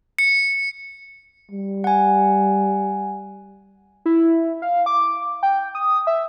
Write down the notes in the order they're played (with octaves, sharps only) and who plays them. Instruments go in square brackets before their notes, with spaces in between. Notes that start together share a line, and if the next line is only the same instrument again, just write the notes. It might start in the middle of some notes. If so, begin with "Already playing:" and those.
[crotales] C#7
[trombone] G3
[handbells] F#5 G#5
[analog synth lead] E4
F5
D6
G5
D#6
E5